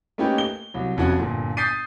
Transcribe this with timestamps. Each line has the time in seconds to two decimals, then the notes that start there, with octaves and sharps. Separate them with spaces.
0.18 A3 A#3 C#4 D#4 G4 B4
0.38 G7
0.74 C2 F#3
0.97 F1 F2 C#4 F#4 F#5
1.19 G1 A#2
1.57 D#6 G6 A6 B6 C7 D#7